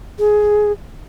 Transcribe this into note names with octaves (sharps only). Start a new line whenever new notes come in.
G#4